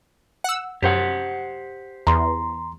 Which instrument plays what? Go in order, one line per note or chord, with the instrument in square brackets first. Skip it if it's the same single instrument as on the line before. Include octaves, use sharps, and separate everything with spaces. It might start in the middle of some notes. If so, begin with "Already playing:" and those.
[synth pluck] F#5 E6
[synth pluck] F#2 [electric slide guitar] G4 C5 F#5
[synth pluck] E2 [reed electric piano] A#5 C6